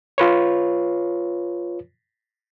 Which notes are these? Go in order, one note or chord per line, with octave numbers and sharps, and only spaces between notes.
F4 B4 C#5